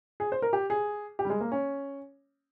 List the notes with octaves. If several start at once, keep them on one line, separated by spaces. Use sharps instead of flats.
G#4
C5
A#4
G4
G#4
G4
G3
G#3
A#3
C#4